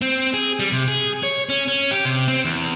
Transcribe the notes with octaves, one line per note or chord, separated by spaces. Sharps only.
C4
G#4
G3
C3
G#4
C#5
C#4
C#4
G4
C3
C4
E2